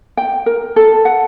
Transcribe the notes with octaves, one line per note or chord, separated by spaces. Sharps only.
G5
A#4
A4
F#5